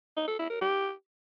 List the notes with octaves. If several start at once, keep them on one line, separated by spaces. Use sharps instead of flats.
D#4
A4
E4
A#4
G4